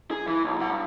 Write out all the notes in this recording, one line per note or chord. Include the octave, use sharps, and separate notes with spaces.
G#4
E3
B1
C3 F#5
G2